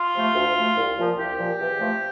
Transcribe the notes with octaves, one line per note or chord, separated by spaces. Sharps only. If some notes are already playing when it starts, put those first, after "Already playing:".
Already playing: F4
C3 F3 A3
D2
C3 F3 A3
C2
A#2 F3
C2 G4
A#2 F3
E2
C3 F3 A3